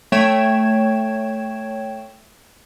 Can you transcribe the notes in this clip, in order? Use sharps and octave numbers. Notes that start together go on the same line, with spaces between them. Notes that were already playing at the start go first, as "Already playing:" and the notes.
A3 C#5 G5 G#6 E7